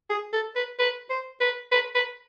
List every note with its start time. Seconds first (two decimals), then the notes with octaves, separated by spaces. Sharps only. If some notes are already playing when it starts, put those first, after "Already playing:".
0.10 G#4
0.33 A4
0.56 B4
0.79 B4
1.10 C5
1.41 B4
1.72 B4
1.95 B4